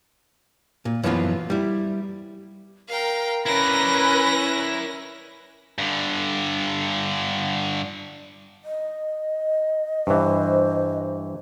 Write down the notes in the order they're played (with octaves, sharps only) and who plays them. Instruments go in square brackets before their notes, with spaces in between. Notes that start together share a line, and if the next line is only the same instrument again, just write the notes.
[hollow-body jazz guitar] A#2
F#2 E3 F3 B3 F4
G3 E4
[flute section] A#4 [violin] F5 G5
[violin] C#4 A#6 [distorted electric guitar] E4 D5 [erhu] B4
[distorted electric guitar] G2 D3
[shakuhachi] D#5
[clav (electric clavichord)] G2 E3 [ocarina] C5